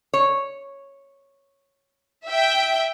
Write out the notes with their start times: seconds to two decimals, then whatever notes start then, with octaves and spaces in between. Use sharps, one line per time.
0.14 C#5
2.26 E5 G5